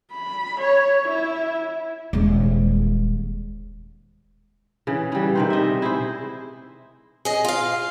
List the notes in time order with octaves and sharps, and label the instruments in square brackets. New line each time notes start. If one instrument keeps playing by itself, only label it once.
[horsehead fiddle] B5
C#5
E4
[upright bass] D#1 G#3
[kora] C#3 E3
E3 G3
C3 D#3 C5
D#5 E5
E4 G#4 C5
[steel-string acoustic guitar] G#4 D#5
F4 F5